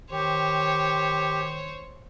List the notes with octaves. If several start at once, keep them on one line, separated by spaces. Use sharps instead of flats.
D#3 G4 C5 C#5